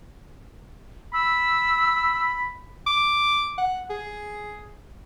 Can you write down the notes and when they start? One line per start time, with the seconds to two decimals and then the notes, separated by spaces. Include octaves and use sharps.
1.13 B5 E6
2.87 D6
3.58 F#5
3.90 G#4